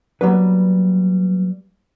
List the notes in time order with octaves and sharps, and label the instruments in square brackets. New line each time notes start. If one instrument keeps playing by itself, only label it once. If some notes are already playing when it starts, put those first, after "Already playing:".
[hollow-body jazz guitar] F#3 G3 A#3 B3 D4 B4